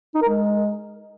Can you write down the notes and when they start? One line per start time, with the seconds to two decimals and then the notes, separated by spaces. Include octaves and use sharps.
0.15 D#4
0.22 A#4
0.29 G#3